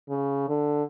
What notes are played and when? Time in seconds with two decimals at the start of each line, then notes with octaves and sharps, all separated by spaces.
0.09 C#3
0.49 D3